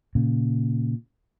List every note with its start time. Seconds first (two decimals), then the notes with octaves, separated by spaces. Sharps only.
0.15 A#2 C#3